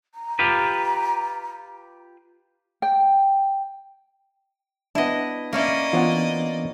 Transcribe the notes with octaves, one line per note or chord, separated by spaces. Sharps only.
A#5
F4 G4 B4
G5
B3 D4 E4 D#5
A#3 C#4 E4 D5 D#5
E3 B3 D4 F4 C#5 F#5